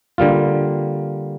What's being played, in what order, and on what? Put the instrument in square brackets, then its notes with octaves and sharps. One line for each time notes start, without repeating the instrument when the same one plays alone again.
[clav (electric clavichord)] D3 G3 A#3 F4